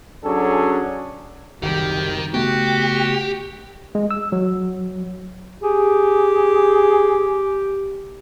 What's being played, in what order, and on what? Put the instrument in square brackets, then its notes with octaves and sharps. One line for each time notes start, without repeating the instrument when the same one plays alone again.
[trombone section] F#3 C#4 D4 G#4 A4
[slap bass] F#1 C2 [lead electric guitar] D#3 [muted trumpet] G4
[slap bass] C#3 A3 B3 [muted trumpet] F#4 [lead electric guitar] G4
[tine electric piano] G#3
E6
F#3
[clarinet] G4 [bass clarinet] G#4